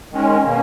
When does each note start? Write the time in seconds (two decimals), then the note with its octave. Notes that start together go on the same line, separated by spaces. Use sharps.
0.11 D#3 G#3 C#4
0.45 B2 A#3 C#4